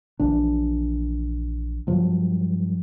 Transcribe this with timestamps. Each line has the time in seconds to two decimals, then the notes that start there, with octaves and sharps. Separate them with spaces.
0.19 A#1 E3 D4
1.87 G2 F3 F#3